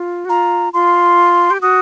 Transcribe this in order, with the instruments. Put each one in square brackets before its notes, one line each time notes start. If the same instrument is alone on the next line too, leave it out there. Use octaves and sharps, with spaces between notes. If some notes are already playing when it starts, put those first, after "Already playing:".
Already playing: [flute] F4
F#4
[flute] F4 [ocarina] A#5
[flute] F4 [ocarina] C6
[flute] G4
[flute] F#4 [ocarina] D#6